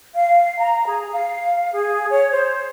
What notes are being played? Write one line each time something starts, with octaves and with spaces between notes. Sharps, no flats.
F5
A#5
G#4
F5
G#4
C#5
C5